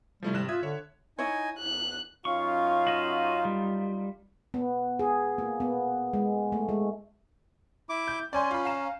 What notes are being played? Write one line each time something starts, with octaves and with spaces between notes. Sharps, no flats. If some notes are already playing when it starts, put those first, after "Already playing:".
C3 F3 G3 A3 E4
G#1 F#6 E7
F4 E5 D#6 G#6
D3 C#5
D#4 E4 C#5 G#5
E2 F#6
F#2 C#4 D#4 F4 F5 C#6
F#4 D#5 E5
G3
B3
G#4
A#3
B3
G#3
A3
G#3
E4 D6
G6
C#4 D5 G#5 C6
F4 B5
F5 A#5 E7